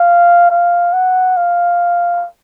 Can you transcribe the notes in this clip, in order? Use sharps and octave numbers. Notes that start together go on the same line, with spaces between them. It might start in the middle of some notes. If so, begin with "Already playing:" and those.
Already playing: F5
F5
F#5
F5